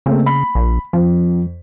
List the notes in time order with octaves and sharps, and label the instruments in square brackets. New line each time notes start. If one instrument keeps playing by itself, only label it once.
[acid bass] C#3 [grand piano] A3 A#3 C4
[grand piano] B5
[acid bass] A#1
[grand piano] F2 [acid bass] F3